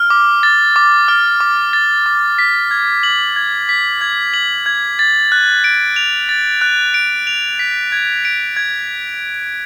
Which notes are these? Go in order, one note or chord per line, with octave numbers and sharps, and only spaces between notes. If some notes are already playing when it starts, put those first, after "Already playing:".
Already playing: F6
D6
A6
D6
F6
D6
A6
D6
B6
G#6
F#7
G#6
B6
G#6
F#7
G#6
A6
F#6
D7
F7
A6
F#6
D7
F7
B6
G#6
D7
G#6